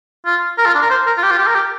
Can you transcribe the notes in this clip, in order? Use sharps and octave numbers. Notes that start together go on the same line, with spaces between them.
F4
A#4
F4
D4
A#4
C5
A#4
F4
G4
F4
G4
A#4
G4